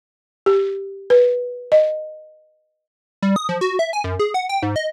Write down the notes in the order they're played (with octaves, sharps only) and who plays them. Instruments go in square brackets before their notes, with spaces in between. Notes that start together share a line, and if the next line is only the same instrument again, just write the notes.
[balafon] G4
B4
D#5
[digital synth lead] G3
D#6
F3
F#4
E5
G#5
F#2
G#4
F#5
G5
G#2
D#5